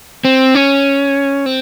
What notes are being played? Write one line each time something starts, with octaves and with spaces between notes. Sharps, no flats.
C4
C#4
C4